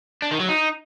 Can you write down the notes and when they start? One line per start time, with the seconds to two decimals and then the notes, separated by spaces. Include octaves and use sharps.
0.22 D4
0.31 D#3
0.40 F#3
0.49 D#4